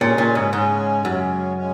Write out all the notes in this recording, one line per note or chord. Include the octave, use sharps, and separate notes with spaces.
A#2 C#3 G#3 C#4
A#2
G#2
G#2 C#3 G#3 C#4
F#2 C#3 G#3 C#4
C#3 G#3 C#4